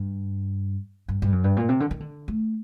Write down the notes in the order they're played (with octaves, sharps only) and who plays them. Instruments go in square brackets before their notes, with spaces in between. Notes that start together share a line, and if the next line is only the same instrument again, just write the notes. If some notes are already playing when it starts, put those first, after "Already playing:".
Already playing: [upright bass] G2
G2
G2
F#2
G2
A#2
C3
D3
D#3
D3
A3